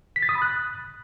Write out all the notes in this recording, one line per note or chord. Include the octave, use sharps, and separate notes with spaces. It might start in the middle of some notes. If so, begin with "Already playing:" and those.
B6
A6
D#6
B5
F#6